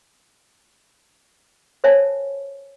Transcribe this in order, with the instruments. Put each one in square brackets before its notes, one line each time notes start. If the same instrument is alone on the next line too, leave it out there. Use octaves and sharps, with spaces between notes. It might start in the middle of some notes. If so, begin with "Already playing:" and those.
[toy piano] A#4 C5 C#5 E5 G#5 A5